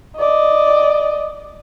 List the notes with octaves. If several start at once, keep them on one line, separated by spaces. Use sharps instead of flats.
D5 D#5